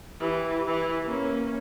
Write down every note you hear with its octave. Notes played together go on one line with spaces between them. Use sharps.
E3 G4
E3 E4
A#3 C#4